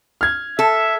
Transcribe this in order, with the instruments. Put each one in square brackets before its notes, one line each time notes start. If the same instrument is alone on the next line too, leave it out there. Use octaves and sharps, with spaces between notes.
[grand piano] F6 G#6
[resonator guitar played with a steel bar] A4 [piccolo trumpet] E5